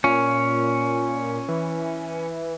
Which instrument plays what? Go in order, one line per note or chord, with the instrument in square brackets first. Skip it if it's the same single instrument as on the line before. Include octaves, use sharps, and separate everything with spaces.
[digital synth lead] A#2 [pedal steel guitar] C#4
[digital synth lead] E3